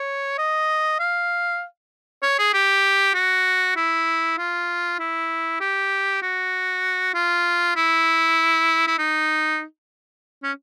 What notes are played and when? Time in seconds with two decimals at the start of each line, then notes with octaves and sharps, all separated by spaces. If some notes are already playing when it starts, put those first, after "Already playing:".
Already playing: C#5
0.38 D#5
0.99 F5
2.23 C#5
2.38 G#4
2.53 G4
3.14 F#4
3.76 E4
4.38 F4
4.99 E4
5.60 G4
6.22 F#4
7.14 F4
7.76 E4
8.87 E4
8.98 D#4
10.43 C#4